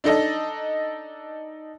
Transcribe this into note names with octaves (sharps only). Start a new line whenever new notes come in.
D4 D#4 A4 D#5